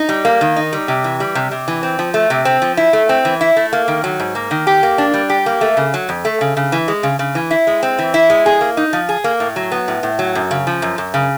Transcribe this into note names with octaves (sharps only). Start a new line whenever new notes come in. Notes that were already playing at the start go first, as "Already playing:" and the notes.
Already playing: D#4
G3
A#3
D#3
D#4
G3
C3
E3
G3
C3
C3
E3
C4
F3
A3
C3
C4
F3
E4
A3
C4
E3
E4
A3
A#3
D#3
F#3
G#2
A#3
D#3
G4
A#3
D4
G3
G4
A#3
A3
C#3
F#3
F2
A3
C#3
C#3
E3
G#3
C#3
C#3
E3
E4
G#3
C4
E3
E4
G#3
G#4
A#3
D#4
F3
G#4
A#3
A2
F#3
B3
A2
A2
F#3
F#2
C#3
F3
F#2
F#2
C#3